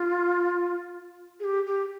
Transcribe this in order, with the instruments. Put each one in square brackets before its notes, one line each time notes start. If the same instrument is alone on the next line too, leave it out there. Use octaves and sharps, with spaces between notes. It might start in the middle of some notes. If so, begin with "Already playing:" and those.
Already playing: [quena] F4
G#4
G4
G4